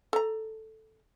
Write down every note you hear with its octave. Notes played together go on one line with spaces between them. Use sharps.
A4 A#5